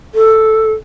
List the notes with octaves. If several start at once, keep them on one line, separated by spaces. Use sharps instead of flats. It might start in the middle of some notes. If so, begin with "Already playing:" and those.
A4